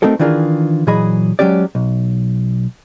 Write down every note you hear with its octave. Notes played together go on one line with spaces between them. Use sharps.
A3 C4 D#4 F#4 A4 A#4
D#3 E3 D4 F4 G#4 A#4
A#2 E3 F#3 G#4 D#5 B5
F#3 G#3 C#4 G4 D5
B1